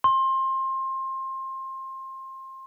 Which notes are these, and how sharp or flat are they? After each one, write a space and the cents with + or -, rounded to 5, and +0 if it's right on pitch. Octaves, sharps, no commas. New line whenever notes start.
C6 +25